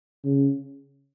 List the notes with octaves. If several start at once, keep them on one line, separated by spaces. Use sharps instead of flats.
C#3